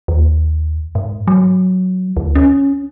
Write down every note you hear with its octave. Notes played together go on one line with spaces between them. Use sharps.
D#2
G#2
F#3
D2
C#4